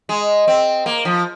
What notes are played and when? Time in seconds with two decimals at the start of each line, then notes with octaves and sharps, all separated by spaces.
0.09 G#3
0.48 C4
0.86 A#3
1.05 F3